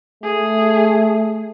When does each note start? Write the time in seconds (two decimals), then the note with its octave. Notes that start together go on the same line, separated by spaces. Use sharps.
0.24 A3 G#4